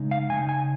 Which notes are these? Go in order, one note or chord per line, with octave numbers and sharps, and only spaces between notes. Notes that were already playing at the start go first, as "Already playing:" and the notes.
Already playing: C#3 G#3 D#4
F5
C#3 A#3 D#4 G#5
G#5